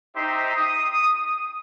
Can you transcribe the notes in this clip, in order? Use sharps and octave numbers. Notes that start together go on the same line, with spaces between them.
D#4 G4 C5 E5 A#5 C6
D#6